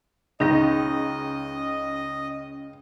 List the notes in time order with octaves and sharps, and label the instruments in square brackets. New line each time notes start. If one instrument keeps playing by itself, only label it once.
[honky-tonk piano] C#2 C#3 A#6 [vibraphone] C#4 [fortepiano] D#4 [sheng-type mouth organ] D#5